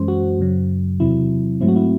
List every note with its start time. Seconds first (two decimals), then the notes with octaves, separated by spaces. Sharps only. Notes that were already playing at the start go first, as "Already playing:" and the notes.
Already playing: F#2 E3 G#3 C#4 C5
0.08 F#4
0.39 F#2 C#3 F#3
1.00 E2 C3 F#3 C4 E4
1.61 G#2 F#3 A3 C4 E4
1.68 F#4
1.76 E4